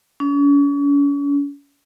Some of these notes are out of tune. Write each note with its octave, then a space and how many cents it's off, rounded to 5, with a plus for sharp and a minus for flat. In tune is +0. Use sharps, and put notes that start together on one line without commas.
C#4 +40